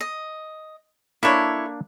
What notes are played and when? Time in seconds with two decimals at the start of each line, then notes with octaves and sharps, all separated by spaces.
0.01 D#5
1.23 A#3 D4 E4 A4 C#5